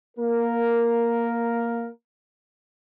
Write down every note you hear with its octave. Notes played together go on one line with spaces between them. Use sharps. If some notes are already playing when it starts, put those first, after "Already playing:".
A#3 A#4